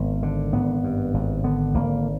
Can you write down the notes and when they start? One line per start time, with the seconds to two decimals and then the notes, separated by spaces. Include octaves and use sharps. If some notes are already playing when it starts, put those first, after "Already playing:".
Already playing: G#1 B3
0.23 D3
0.53 G#1 B3
0.84 G2
1.14 G#1
1.44 D3 B3
1.74 G#1 A#3